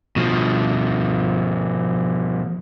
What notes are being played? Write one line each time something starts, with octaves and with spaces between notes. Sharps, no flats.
B2 F3